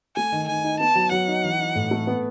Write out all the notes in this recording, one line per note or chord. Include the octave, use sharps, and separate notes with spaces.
A3 G#5
D#3
D#3 G#5
D#4
B3 A5
F#3
F#3 F#5
D#4
E3
D#4
A2
A3
B3